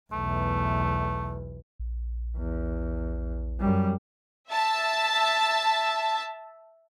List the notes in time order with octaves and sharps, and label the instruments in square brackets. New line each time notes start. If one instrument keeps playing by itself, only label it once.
[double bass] B1 E2 [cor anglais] A3
[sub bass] A#1
[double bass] E2
F#2 G3
[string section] E5 A5